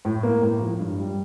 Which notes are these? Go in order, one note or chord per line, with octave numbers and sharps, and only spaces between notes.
A2
A#3
A2
F3
G2
G3